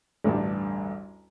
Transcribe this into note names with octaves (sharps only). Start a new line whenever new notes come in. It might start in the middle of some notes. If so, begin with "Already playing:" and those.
A1 D2 G2 G3 D4